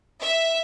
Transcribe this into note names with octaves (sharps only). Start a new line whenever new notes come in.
E5